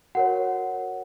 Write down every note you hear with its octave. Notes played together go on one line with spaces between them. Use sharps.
F#4 A#4 C#5 F#5